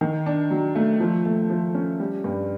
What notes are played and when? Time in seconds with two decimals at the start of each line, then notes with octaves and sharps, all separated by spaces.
0.01 D#3
0.26 D4
0.51 F#3
0.75 A3
1.00 F3
1.26 A3
1.50 F3
1.75 C#4
2.00 G3
2.24 G2